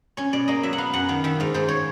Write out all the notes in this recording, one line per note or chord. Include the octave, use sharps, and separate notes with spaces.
C#4 C#5
B2 D5
A#3 D#5
F#3 E5
F#5
B3 F5
F#2 F#5
D#3 F5
D#3 E5
G#2 F5
G#2 C5
C#5